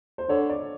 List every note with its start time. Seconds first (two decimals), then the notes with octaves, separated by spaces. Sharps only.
0.18 C5
0.29 D3 C#5
0.49 D5